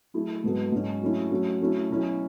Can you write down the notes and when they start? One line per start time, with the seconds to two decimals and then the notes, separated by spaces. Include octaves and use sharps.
0.14 F#3 A3 E4 G#4
0.44 G#2 F#3 B3 F#4 A4
0.72 G#2 F#3 C#4
1.01 F#3 A3 C#4 E4
1.30 F#3 A3 C#4 F#4 A4
1.60 F#3 A3 C#4 E4
1.90 B2 F#3 C#4 E4